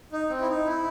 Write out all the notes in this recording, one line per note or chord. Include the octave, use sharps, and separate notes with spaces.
D#4
C4
E4
D#4
E4